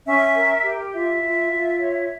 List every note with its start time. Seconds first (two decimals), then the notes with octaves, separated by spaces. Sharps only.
0.06 C#4 E5
0.35 A#4
0.64 G4
0.93 F4 E5
1.22 F4
1.51 F4
1.80 C#5